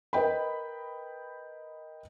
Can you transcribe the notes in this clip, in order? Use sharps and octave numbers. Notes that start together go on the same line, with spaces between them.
A#4 B4 D#5 G5 B5